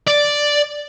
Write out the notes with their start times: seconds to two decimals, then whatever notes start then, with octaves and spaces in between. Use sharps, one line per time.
0.07 D5